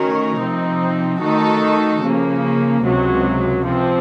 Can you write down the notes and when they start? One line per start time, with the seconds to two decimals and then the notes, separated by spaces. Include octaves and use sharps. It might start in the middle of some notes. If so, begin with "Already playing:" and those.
Already playing: D#3 A3 C#4 F#4 A#4
0.39 C3 F3 C4 D#4
1.21 D#3 A3 D#4 F#4 A4
2.03 C#3 F3 A#3
2.84 C#2 C3 F#3
3.64 C3 F3 C4